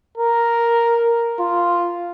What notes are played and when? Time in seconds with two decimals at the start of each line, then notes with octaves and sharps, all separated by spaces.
0.18 A#4
1.39 F4